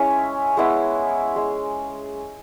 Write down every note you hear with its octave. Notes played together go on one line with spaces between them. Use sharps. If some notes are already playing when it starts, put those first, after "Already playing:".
Already playing: G#3 C#4 E4 E5
G#3 B3 E4
G#3